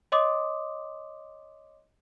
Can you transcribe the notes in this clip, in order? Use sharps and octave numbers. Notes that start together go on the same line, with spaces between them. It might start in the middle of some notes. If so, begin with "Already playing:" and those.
C#5 D#5 C6 D6 D#6